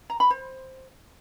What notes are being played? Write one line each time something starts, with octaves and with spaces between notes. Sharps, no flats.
A#5
B5
C5